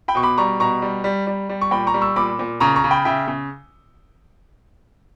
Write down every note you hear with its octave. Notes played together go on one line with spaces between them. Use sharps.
G5 B5
B2 C#6
B5 D6
G3 A#5 C#6
B2 A#5 C#6
G3
G3
G3
G3
C#6
A#2 G5 B5
A#5 C#6
G3
C#6 E6
A#2 B5 D6
A#2
C#3 A#5 C#6
A#5 C#6
C#3
G5 B5
C#3 E5 G5
C#3